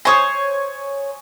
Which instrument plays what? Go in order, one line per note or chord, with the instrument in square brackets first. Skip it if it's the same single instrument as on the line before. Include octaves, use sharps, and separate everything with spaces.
[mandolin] C5 C#5 [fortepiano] G#5 C#6 D#6